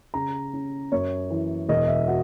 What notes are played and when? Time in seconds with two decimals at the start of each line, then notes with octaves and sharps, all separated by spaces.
0.14 C#3 A#5
0.53 C#4
0.92 F#2 C#5
1.30 E3
1.69 E1 D#5
1.88 E5
2.08 F#4